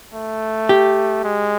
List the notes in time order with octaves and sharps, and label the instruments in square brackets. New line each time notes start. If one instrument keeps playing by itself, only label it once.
[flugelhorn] A3
[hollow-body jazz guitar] G4
[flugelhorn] G#3